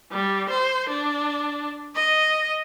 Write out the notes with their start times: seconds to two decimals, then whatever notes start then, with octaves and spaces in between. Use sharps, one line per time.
0.12 G3
0.50 C5
0.89 D4
1.95 D#5